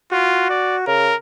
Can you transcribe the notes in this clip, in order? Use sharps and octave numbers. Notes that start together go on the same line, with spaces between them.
F4 F#4
D5
C#3 A#4